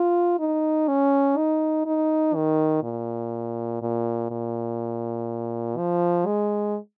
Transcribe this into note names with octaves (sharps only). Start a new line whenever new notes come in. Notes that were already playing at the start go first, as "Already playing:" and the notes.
Already playing: F4
D#4
C#4
D#4
D#4
D#3
A#2
A#2
A#2
F3
G#3